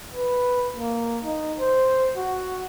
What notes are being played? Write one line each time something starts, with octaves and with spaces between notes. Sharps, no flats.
B4
A#3
D#4
C5
F#4